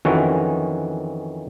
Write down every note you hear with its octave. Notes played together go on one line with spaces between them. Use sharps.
F2 D#3 E3 C#4 F#4